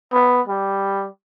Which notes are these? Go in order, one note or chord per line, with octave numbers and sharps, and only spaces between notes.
B3
G3